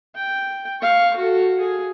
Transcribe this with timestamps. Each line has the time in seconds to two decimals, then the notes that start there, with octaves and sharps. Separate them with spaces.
0.15 G5
0.81 F5 C#6
1.17 F#4 A4
1.59 G#4